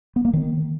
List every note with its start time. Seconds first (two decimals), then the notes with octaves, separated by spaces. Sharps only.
0.16 B3
0.25 A#3
0.33 D#3